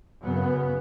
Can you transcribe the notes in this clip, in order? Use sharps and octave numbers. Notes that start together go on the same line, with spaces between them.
F#2 C#3 B3